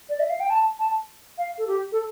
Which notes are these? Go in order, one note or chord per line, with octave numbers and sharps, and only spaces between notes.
D5
E5
F5
G5
A5
A5
F5
A4
G4
A4